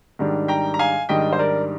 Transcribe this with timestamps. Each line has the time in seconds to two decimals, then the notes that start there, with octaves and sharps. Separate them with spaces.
0.19 G#2 D#3 G3 D4
0.48 G5 A#5
0.74 A#5
0.79 F5 G#5
1.09 G#2 D#3 G3 D4 D#5 G5
1.33 C5
1.39 A#4 D5